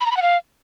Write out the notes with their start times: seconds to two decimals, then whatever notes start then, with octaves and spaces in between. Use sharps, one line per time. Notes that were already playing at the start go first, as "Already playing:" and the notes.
0.01 B5
0.06 A#5
0.11 B5
0.17 F#5
0.22 F5